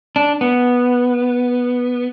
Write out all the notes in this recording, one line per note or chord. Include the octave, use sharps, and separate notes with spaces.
D4
B3